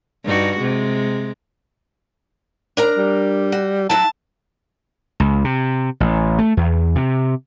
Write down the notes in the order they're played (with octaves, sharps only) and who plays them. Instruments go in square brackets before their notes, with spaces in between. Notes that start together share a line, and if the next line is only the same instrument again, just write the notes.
[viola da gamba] G2 D#4 F#4
C3 G#3
[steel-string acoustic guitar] D4 A#4 A#5
[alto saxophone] G3
[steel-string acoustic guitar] F#4
[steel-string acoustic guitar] F#3 E4 F#4 [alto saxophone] A5
[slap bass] C#2
C3
A1
A3
E2
C3